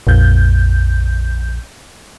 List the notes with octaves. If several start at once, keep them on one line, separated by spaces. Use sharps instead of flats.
A#1 F2 G6